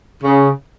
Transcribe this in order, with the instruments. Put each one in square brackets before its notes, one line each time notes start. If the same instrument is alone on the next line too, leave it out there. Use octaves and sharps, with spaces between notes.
[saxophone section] C#3